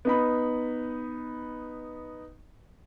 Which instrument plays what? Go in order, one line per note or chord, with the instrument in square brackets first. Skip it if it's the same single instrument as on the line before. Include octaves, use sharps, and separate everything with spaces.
[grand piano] B3 D#4 B5